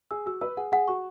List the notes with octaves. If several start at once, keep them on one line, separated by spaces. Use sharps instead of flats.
G#4 E6
F#4 E6
B4 E6
G#4 F#5
G#4 F#5
F#4 C#6